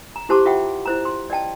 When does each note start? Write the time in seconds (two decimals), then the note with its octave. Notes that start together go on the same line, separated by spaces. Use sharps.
0.16 A#5
0.29 E4 G4 C5 A5 C6 D6
0.45 F4 E5 F#5 G5
0.86 E4 C5 A#5
1.05 C6
1.30 D5 D#5 G5 A5